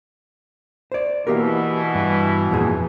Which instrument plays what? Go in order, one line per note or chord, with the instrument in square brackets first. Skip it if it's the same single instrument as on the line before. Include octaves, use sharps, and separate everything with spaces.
[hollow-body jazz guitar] C5 D5
[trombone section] B2 E3 [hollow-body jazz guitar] A#3 G4 A#4
[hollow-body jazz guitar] G2
F2 A#2 G#4